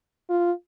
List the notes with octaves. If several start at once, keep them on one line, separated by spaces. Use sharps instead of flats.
F4